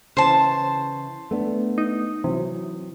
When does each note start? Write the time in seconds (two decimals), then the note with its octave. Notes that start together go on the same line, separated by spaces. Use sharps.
0.17 C#3 E3 C5 A5
1.31 A3 B3 D4
1.78 D#4
2.24 C3 E3 F#3